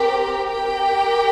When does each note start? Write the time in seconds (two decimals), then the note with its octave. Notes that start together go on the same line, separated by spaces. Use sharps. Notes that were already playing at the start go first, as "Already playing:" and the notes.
Already playing: C4 G4 A#4 G5
0.47 G4 A#4 G5